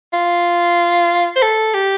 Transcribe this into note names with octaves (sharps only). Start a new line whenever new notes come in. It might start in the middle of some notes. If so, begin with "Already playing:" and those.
F4
C5
A4
G4